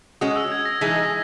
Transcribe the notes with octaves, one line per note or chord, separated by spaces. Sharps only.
G#3 C#4 F#4 D#6
E6
G#6
A#6
E3 G#3 D#4 G#4 B6